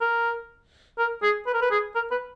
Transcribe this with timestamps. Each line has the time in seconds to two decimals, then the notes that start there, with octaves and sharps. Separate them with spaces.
0.01 A#4
0.98 A#4
1.23 G#4
1.47 B4
1.54 A#4
1.61 B4
1.71 G#4
1.95 A#4
2.11 B4